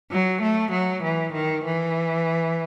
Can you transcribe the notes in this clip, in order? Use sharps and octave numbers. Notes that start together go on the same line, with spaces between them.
F#3
A3
F#3
E3
D#3
E3